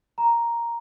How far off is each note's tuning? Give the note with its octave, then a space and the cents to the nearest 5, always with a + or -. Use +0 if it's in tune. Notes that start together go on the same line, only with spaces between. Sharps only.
A#5 +5